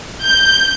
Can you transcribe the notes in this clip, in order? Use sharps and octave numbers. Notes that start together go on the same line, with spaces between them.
G6